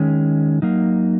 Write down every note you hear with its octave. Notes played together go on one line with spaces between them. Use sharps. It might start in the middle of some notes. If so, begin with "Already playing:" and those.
Already playing: D#3 G#3 C#4
F#3 A#3 D#4